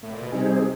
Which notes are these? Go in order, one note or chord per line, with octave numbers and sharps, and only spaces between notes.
A2
A#2
B2
C3 G3 C4 D#4 G#4